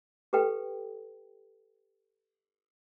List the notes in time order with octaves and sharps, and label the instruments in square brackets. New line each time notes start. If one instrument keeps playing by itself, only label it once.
[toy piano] G4 A4 B4 G5